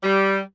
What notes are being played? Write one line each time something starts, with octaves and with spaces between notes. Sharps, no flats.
G3